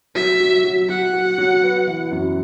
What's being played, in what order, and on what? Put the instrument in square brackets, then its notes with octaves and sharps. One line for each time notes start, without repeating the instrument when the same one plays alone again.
[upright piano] F#3 [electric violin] E5
[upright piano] F#3
F#3
[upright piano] F#3 [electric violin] F#5
[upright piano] F#4
F#3
B3
E3
F#2